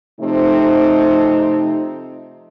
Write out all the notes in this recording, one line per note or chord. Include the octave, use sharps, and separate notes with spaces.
C3 F3 A3 C4 D#4